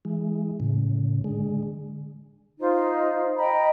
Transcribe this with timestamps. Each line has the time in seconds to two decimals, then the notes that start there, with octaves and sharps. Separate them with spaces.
0.05 E3 G#3
0.60 A2 C#3
1.24 D3 G#3
2.58 D#4 F4 C5
3.37 D#5 G5 A#5 B5